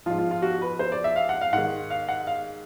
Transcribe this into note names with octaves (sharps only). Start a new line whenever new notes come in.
G#2 F3 F4
F4
F4
F#4
B4
C5
D5
E5
F5
F#5
F5
G#2 D#3 F#5
F5
F#5
F5